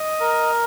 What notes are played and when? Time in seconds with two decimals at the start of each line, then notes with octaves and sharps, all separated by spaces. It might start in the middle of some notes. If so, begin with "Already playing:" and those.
Already playing: D#5
0.20 A#4